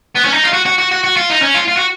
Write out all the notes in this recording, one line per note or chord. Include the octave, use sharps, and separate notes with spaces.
B3
C#4
D#4
F4
F#4
F#4
F#4
F#4
F#4
F4
D#4
C#4
F4
F4
F#4